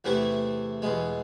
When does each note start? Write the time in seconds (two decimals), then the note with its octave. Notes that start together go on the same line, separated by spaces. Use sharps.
0.04 E2 C3 E3 A3 E4
0.82 E2 B2 G#3